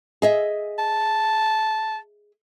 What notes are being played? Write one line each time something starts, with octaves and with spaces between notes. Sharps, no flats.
G#4 D#5 E5
A5